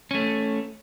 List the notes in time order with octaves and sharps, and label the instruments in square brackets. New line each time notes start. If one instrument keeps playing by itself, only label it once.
[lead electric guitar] A3 C#4